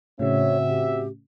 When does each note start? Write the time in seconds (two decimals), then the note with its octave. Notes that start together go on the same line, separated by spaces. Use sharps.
0.19 A2 C#3 C4 F#4 C#5 E5
0.69 G4